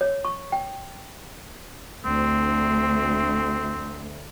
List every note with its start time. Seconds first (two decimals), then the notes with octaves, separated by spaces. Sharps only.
0.01 C#5
0.25 C#6
0.52 G5
2.05 D2 C4